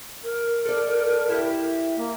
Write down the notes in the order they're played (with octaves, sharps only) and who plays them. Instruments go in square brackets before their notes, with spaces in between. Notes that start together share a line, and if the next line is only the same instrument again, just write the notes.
[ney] A#4
[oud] A4 D5
E4 G4
[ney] A#3